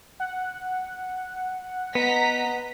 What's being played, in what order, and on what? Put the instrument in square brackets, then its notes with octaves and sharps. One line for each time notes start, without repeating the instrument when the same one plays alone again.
[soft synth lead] F#5
[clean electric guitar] B3 [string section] D#5 A#5 B6